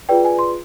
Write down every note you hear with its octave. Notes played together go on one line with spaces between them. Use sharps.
F4 G#4 B4 D5 G5
G#5
C6